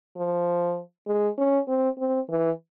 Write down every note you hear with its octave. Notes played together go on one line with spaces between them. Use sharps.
F3
G#3
C#4
C4
C4
E3